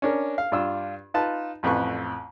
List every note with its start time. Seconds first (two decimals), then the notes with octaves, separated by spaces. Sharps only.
0.02 C#4 D4 A#4
0.38 F5
0.52 G2 D4 F4 E6
1.14 D#4 F4 B4 A5
1.63 A1 F2 B4 C#6